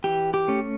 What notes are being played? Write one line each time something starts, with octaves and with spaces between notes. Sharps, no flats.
E3 G4
G4
A3 C#4